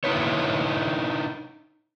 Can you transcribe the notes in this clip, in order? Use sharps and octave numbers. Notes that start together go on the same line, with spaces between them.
D#4 E4 B4 C#5